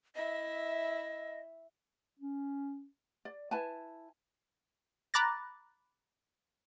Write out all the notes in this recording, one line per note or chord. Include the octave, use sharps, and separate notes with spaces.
E4 D#5 E5
C#4
D5
E4 B4 G#5 A5
A#5 B5 D6 F#6 A6 A#6